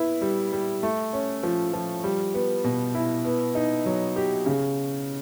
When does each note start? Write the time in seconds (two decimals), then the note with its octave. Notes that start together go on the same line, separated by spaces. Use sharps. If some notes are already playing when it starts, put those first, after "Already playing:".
Already playing: B3 E4
0.21 G3
0.52 G3
0.83 A3
1.13 C#4
1.43 F3
1.73 F3
2.04 G3
2.34 B3
2.64 B2
2.95 E4
3.25 B3
3.55 D#4
3.86 F#3
4.16 G4
4.46 C#3